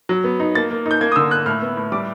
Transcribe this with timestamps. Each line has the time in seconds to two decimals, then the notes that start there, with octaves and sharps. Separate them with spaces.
0.09 F#3
0.24 B3
0.40 D#4
0.55 A#3 A6
0.71 A#3
0.86 D#4
0.91 G6
1.01 A#3 G#6
1.12 D#6
1.16 D3 E6
1.31 A#3 F#6
1.46 A2 F6
1.62 B3
1.77 A2
1.92 G3 D6